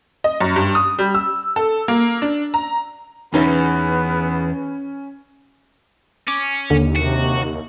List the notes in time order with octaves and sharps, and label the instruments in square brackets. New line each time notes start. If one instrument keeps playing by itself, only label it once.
[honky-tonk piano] D#5
F#2
G2
D#6
G3
E6
A4
A#3
D4
A#5
[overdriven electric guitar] E2 [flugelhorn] B3 [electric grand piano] C#4 [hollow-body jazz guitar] D#4 B4 E5
[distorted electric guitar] C#4 [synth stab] D6
[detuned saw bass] D#2 [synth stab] D3
[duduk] C3 [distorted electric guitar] F#4